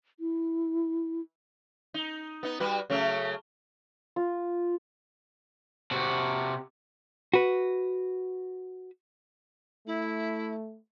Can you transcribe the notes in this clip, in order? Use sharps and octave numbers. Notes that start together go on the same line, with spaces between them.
E4
D#4
B3 D#4
G3 F#4 B4
C#3 F#3 A3
F4
C3 F#4
F#4 B4
A3 E4